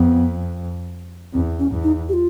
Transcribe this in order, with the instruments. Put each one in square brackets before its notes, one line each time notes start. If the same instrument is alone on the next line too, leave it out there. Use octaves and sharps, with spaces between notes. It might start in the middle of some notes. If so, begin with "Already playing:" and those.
Already playing: [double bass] F2 [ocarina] B3
[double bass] E2 [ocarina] C4
[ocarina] C#4
[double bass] E2
[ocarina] D#4
G4
F4